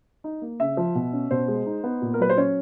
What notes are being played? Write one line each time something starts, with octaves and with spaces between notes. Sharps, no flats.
D#4
A#3
C#3 E5
F3
B2
C#4
B2 C5
G#3
D#4
B3
A#2
A#4
F#3 B4
C5
C#4 C#5